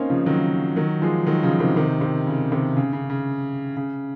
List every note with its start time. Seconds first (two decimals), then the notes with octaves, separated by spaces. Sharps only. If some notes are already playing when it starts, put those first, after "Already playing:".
Already playing: A#3 C4 C#4 D#4
0.10 C#3 F3
0.26 D#3 F#3
0.76 D#3 F#3
1.02 F3 G#3
1.26 D#3 F#3
1.43 C#3 F3
1.60 C3 D#3
1.76 C3 D#3
2.01 C3
2.27 C#3
2.52 C3 D#3
2.76 C#3
2.93 C#3
3.10 C#3
3.77 C#3